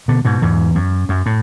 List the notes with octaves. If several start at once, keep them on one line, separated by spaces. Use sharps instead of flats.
B2 D3
G#2 B2
E2 G#2
F#2
F#2
A2